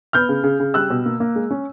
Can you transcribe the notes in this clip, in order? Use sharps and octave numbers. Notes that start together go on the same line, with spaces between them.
B3 F6 G6
C#3
C#3
C#3
G3 E6 F#6
B2
A#3
A#3
G#3
C#4